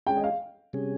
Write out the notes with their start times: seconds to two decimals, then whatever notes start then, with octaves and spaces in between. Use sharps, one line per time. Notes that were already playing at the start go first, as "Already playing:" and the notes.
0.07 G#3 C#4 G#4 G5
0.17 D#5
0.24 F5
0.73 C3 G3 C#4 G#4